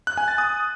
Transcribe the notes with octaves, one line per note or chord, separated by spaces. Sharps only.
F#6
G#5
A6
D#6